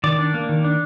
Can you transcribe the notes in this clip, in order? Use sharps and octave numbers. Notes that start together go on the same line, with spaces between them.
D#3 D5
D4
A#3
D#3
D4